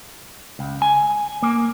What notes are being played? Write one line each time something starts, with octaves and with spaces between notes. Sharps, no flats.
C#2
G#5
A#3